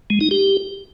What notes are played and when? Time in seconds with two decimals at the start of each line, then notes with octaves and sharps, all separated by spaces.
0.10 G#3
0.21 D#4
0.31 G4